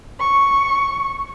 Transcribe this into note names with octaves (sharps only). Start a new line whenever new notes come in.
C#6